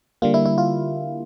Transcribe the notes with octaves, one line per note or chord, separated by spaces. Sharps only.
D3 G3 A#3 F4
E4
E4
F4